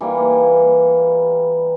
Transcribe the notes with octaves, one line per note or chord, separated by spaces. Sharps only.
E3 G3 A#3